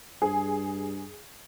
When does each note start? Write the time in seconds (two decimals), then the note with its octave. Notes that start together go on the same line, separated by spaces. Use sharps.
0.22 G2 G#4